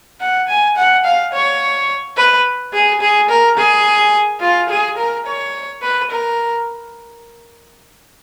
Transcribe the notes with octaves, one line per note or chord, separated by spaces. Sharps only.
F#5
G#5
F#5
F5
C#5
B4
G#4
G#4
A#4
G#4
F4
G#4
A#4
C#5
B4
A#4